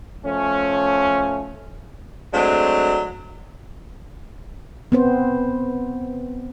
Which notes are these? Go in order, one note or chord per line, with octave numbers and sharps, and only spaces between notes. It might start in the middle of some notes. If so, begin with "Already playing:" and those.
F3 A3 C#4
F#3 G#3 A3 C4 D4
B3 C4 C5